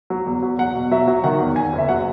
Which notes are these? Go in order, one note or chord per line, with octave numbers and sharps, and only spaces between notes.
F#3
E2
F#3
E2 F#5
B2
F#3 E5
F#3
D#3 F#5
E2
E2 G#5
F#1
E5
F#3 F#5